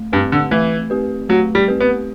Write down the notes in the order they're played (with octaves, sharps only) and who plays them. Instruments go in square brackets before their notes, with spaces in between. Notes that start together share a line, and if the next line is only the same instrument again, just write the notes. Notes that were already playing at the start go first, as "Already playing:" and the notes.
Already playing: [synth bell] A3
[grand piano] G2 [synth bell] C4 G4 B4
[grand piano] D3
[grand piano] E3 [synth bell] A3
[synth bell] C4 G4 B4
[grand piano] F#3 [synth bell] A3
[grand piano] G3
[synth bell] C4 G4 B4
[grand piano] B3